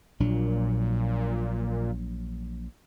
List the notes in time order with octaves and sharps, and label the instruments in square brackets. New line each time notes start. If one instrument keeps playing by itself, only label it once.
[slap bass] A#1 F#3 D4 [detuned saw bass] A#2